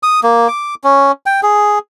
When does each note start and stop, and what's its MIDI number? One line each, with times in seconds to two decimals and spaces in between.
0.03 0.20 87
0.23 0.48 58
0.48 0.75 86
0.84 1.12 61
1.26 1.41 79
1.43 1.79 68